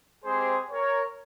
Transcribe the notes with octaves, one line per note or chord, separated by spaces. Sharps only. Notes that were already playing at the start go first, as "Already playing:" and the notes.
G#3 C4 G4 G#4 C5
A#4 C#5